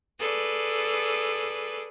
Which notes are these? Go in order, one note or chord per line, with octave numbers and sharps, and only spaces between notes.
G#4 A4 B4 D5